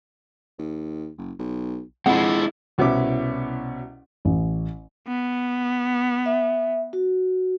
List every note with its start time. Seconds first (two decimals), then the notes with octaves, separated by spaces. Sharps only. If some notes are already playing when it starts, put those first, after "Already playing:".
0.59 D#2
1.18 F#1
1.39 B1
2.06 F2 G#3 C4 E4 F#5
2.78 C2 B2 B3 C#4 E4 D6
4.25 A1
5.07 B3
6.26 E5
6.93 F#4